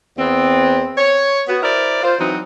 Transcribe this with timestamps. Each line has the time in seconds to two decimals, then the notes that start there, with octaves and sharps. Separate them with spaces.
0.18 E2 B3 C4
0.98 C#5
1.49 B3 F#4
1.62 E4 A#4 C5 D5
2.04 F4 C5
2.19 E3 F#3 C4 D#4